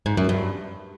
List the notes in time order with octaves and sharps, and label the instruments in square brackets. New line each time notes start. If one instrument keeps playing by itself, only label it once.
[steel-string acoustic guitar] G#2
F#2
G2